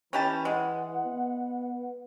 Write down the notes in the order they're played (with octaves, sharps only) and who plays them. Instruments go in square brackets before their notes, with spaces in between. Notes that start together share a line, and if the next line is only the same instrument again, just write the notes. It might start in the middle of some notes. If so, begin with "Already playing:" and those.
[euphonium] E3 [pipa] C#4 G4 A5 [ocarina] B5
[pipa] G#3 [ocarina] F#5
[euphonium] B3